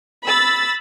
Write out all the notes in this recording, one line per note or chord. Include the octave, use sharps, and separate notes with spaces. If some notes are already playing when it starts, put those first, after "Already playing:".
B5 E6 A6